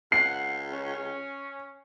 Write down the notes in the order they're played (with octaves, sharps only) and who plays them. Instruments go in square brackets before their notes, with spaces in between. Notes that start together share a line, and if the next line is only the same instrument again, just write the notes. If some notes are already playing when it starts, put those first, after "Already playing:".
[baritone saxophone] C#2 [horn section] F#5 [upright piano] C7
[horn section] C#4